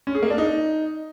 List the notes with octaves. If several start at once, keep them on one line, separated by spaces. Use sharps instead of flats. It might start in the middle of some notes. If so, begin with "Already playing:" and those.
C#4
G#4
A#3
D4
D#4